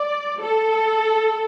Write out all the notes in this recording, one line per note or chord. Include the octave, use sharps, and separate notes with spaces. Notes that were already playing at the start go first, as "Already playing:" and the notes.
Already playing: D5
A4